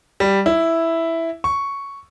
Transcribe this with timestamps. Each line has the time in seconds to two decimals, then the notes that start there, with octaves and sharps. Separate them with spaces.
0.20 G3
0.46 E4
1.44 C#6